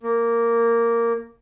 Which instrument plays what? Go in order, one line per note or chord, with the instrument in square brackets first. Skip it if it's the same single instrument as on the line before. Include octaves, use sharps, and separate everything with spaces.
[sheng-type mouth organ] A#3